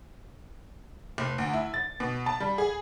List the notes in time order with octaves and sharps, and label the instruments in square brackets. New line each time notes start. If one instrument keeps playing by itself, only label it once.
[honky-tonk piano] F1
D2
E4
A6
B2
A5
G3
G#4